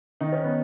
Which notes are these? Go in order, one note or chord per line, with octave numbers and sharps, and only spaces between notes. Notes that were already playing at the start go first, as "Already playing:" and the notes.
D#3 D#4
C#4
B3